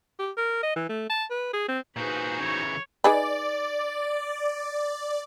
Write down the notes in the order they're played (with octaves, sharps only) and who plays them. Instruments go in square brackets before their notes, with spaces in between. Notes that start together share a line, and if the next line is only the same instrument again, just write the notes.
[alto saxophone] G4
A#4
D#5
E3
A3
A5
B4
G#4
C4
[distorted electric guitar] A#2 G#4 [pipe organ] D#4 F#4 C5 [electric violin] B4
[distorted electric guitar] C#3 E3 [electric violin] C#5
[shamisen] D#4 G#4 B4 [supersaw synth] D5